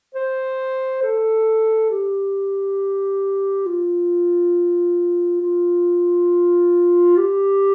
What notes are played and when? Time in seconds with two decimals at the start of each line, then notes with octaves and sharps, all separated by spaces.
0.15 C5
1.02 A4
1.90 G4
3.66 F4
5.42 F4
7.17 G4